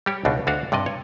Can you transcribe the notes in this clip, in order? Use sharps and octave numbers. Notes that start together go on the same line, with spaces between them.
G3 G4 C#5
C#2 B2 D4 D#4
D2 D4 F#4 F5
G2 C3 D5 D#5
C#5